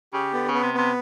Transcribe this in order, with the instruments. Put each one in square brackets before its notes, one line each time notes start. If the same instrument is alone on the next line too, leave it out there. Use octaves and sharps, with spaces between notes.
[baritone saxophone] C#3 [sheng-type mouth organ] G4
[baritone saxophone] D3 [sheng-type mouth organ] B3
[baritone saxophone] C#3
[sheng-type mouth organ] B3
[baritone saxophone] C3
[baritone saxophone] C3 [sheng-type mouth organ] B3